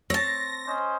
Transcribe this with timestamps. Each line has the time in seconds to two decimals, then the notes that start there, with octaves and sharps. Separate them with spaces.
0.10 C4 C#5 A5 A#6
0.67 C#4 C5 D#5